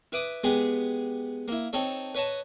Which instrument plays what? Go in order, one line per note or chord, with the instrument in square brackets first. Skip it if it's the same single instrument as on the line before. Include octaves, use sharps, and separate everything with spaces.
[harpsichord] E4 B4 D6 D#6
G#3 B3 G4 G#4
A#3 E4
C4 D#4 A4 C#5
B4 C#5 D#5 A5 A#5